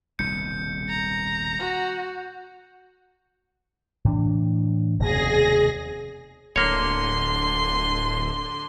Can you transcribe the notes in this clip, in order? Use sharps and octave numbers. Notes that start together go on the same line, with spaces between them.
D#1 C2 B2 G6 C#7
A#5
F#4
A2 E3 D4
F1 D#2 B2 G#4 A#6
D1 D3 A#3 C#5 C6